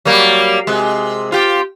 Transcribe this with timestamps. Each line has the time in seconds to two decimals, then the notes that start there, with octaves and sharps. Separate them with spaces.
0.05 F#3 G3 A#3
0.67 C3 G#3
1.32 F4 G4